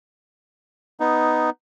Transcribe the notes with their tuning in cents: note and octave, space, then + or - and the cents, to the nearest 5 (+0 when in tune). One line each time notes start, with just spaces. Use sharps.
B3 +5 D#4 +0